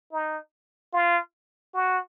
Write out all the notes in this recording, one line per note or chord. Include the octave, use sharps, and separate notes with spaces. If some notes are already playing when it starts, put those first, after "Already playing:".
D#4
F4
F#4